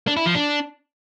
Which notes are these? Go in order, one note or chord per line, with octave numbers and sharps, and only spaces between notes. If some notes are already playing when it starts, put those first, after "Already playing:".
D4
E4
F3
D4